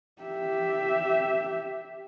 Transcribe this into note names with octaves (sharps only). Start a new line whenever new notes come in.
G4 E5